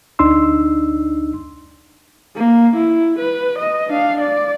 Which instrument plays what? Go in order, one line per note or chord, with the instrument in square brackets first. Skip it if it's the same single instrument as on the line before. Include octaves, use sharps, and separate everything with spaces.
[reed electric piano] D2 D4 D#4 C6 E6
[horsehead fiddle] A#3
E4
B4
D#5
D4 F5
D5